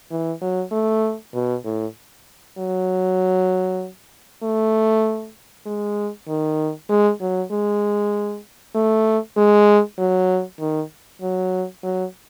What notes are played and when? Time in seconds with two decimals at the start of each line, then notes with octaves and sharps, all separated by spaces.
0.11 E3
0.41 F#3
0.72 A3
1.34 B2
1.65 A2
2.58 F#3
4.43 A3
5.66 G#3
6.28 D#3
6.89 G#3
7.21 F#3
7.52 G#3
8.75 A3
9.37 G#3
9.98 F#3
10.60 D#3
11.22 F#3
11.83 F#3